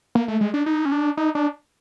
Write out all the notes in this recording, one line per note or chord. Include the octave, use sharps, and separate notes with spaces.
A#3
A3
G#3
D4
D#4
C#4
D4
D#4
D4